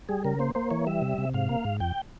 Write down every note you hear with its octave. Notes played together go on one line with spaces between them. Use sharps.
G3 G#4
C#3 A#4
A#3 C5
A#3 C5
E3 C#5
G3 E5
C3
C3
G#2 F5
A#3
G#2
F2 G5